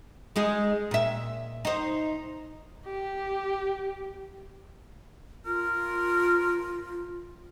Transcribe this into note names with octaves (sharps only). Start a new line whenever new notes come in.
G#3 D#4 G#4
A#2 E5
D#4 C5
G4
F4 A#4